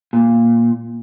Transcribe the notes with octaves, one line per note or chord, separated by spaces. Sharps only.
A#2